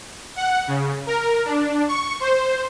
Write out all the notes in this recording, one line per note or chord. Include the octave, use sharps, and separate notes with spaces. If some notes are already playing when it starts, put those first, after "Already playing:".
F#5
C#3
A#4
D4
C#6
C5